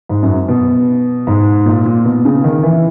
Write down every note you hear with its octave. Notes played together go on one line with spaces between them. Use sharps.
G#2
F#2
B2
G#2
A#2
A#2
B2
C#3
D#3
E3